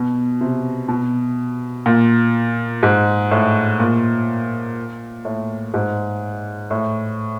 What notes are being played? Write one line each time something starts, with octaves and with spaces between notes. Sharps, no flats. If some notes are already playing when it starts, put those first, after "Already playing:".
Already playing: B2
C3
B2
A#2
G#2
A2
A#2
A2
G#2
A2